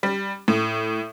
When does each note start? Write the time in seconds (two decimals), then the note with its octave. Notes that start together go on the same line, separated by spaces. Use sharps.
0.03 G3
0.48 A2